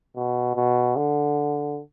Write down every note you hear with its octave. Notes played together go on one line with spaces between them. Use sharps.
B2
B2
D3